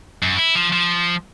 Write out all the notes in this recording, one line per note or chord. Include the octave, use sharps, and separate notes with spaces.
F#2
E4
F3
F3